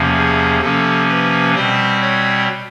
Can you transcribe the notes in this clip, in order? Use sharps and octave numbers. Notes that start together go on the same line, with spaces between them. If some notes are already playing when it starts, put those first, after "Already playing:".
Already playing: E2 C3 F3 A#3 C#4
G#4
C3 F3 A#3 C#4 A4
B4
B2 G3 C4 C5
C#5